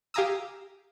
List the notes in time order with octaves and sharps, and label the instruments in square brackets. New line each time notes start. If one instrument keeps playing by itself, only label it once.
[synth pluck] G4 F5 G#5 A#5 D#6 E6